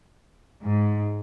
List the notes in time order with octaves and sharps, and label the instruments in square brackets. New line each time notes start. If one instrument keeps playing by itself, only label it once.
[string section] G#2